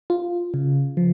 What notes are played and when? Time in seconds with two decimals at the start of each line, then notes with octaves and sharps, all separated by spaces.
0.10 F4
0.54 C#3
0.97 F3